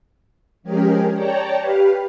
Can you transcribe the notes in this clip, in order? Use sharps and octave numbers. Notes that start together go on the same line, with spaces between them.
F3 G#3 C#4 G4 G#4 A#4
C#5 D5 G5 A5 A#5
G4 B4 F5